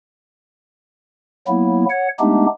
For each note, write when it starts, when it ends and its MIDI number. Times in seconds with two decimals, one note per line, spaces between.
1.48 1.85 54
1.48 1.85 58
1.48 1.85 59
1.48 1.85 64
1.90 2.08 73
1.90 2.08 78
2.20 2.46 56
2.20 2.46 57
2.20 2.46 59
2.20 2.46 62
2.20 2.46 63
2.20 2.46 67